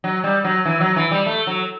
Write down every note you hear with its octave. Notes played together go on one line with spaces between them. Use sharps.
F#3
G3
F#3
E3
F#3
E3
G3
A3
F#3